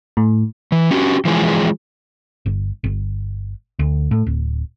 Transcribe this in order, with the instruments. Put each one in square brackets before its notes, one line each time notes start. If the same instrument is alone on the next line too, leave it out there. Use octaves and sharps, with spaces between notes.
[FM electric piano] A2
[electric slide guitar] E3
C#4 F#4 G4
E3 F3 G#3 G#4
[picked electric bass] G1
G1
D2
A2
D1